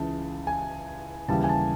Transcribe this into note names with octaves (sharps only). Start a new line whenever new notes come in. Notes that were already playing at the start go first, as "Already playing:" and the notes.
Already playing: C#2 C#3 E3 A5
G#5
D#2 C#3 E3 G3 A5
G#5
A5